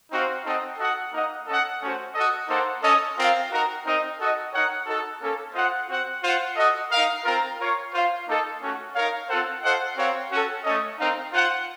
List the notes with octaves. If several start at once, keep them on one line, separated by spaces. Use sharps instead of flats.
C4 D#4 F#4 C5 F5
C4 D#4 A4 D#5 F#5
F#4 A4 D#5 F#5
A#3 D#4 A#4 D#5 F#5
C#4 A4 D#5 F#5
A3 C#4 F#4 C5
F#4 A4 D#5
A#3 D#4 A4 C5 F#5
C#4 A4 D#5
C4 F4 A#4 F5
D#4 F#4 A#4
C4 D#4 A#4 D#5
F#4 A4 D#5
D#4 A#4 C#5 F#5
D#4 F#4 A4
A#3 C#4 A4
F4 C5 D#5 F#5
C4 F#4 C5 F#5
F4 C5 F#5
F#4 A4 D#5
D#4 A#4 F5
C4 F4 A#4
F4 A#4 C#5 F5
F4 C5 F5
A#3 D#4 A4 D#5
A3 C#4 F#4
D#4 A#4 C#5 F5
C4 F4 A4 C5 F#5
F4 A4 C5 D#5 F#5
C4 F#4 A#4 C#5 F5
C#4 F#4 A4
A3 C#4 A4 D#5
C4 D#4 A#4 F5
F4 C5 F#5